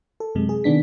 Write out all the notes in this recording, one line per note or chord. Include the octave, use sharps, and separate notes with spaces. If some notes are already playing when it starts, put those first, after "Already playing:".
A4
F#2 C3 G#3
G#4
C3 D#3 B3 D4 B6